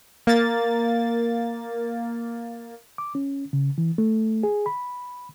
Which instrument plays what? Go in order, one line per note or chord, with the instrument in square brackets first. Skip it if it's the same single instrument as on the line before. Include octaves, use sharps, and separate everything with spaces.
[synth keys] A#3 A6
[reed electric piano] D6
C#4
C#3
E3
A3
G#4
B5